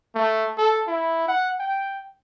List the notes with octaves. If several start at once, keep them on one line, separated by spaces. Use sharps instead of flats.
A3
A4
E4
F#5
G5